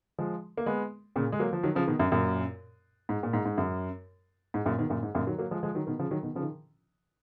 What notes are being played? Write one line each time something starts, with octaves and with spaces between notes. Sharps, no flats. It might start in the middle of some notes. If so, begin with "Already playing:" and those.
F3 G#3
A#3
G#3 B3
A#2 C#3
G#3
F#3 A#3
F3
D#3 F#3
C#3 F3
B2 D#3
F#2
F#2 A#2
G#2
A#2
G#2
G#2
F#2
G#2
F#2 A#2
B2 D#3
F#2 A#2
G#2
F#2 A#2
D#3 F#3
F#3 A#3
F3 G#3
F3 G#3
D#3 F#3
B2 D#3
C#3 F3
D#3 F#3
B2 D#3
C#3 F3
D#3